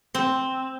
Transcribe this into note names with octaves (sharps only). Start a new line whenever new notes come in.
C4